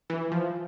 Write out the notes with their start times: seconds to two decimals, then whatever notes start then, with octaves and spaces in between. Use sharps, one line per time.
0.10 E3
0.32 F3